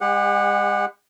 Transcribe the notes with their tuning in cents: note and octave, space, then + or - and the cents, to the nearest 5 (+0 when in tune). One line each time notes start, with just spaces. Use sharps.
G#3 -40 G4 +35 F#5 -10